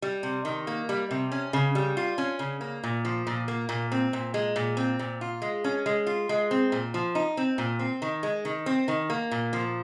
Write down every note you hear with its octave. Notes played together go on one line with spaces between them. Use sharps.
G3
C3
D#3
A#3
G3
C3
C#4
C#3
G3
F4
C#4
C#3
A#3
A#2
F3
A#2
A#3
A#2
C4
A#2
G#3
A#2
C4
A#2
F4
G#3
C#4
G#3
F4
G#3
C4
A#2
F3
D#4
C4
A#2
C4
D#3
G#3
D#3
C4
D#3
A#3
A#2
F3